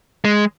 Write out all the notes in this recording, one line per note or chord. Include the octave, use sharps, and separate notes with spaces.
G#3